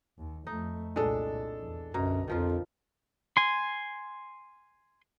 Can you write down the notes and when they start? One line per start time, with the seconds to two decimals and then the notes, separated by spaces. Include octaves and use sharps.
0.18 D#2
0.47 F2 A3 D#4
0.96 C2 A#2 G#3 D4 A4
1.60 E2
1.94 B1 F#2 B2 D3 A#5
2.28 F2 D#3 F3 F4
3.37 G#5 C6